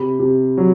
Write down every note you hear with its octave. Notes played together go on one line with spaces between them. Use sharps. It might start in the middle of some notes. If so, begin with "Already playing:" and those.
Already playing: C3 B5
C3
F#3